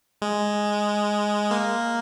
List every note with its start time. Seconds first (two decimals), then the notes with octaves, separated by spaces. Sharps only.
0.22 G#3
1.51 A#3